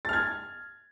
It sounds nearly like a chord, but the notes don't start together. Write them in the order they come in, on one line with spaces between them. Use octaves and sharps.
A6 F6 G#6